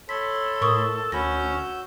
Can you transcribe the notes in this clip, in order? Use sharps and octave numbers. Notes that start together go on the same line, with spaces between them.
A4 C#5 B5 C6 B6
A2 A#4 C#6 D#6
D2 C#4 F#4 B5 E6 G6 A#6